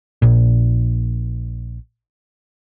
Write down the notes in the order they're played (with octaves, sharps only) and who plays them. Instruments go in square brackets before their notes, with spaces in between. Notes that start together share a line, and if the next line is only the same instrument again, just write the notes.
[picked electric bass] A#1 A#2